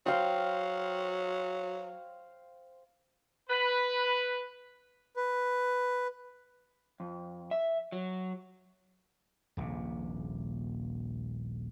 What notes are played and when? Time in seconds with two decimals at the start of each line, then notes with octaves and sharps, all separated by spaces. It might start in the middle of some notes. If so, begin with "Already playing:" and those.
0.06 F#3 C5 F5 G5
3.50 B4
5.16 B4
7.00 F2
7.51 E5
7.92 F#3
9.57 D#1 A#1 C3